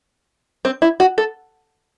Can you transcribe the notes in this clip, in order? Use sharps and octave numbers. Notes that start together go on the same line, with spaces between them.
C4
E4
F#4
A4